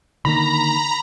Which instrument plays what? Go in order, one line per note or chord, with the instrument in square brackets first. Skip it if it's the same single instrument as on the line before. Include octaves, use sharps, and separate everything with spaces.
[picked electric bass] D3 D#3 A#3 [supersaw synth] A#5 [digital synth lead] B5